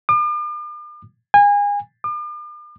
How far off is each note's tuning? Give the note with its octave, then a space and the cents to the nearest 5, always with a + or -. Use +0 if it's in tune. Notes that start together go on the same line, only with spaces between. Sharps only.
D6 +45
G#5 -30
D6 +45